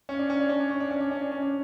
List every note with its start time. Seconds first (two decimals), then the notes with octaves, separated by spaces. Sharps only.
0.09 C#4
0.19 D4
0.30 C#4
0.40 D4
0.49 C#4
0.60 D4
0.70 C#4
0.80 D4
0.91 C#4
1.01 D4
1.11 C#4
1.21 D4
1.32 C#4
1.42 D4